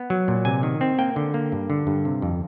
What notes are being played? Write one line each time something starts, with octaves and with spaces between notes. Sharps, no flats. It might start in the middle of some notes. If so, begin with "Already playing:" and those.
Already playing: B3
F#3
A#2
C3 G#5
D#3
C4
A#3 G5
D3
A#3
G2
D3
G2
C3
F2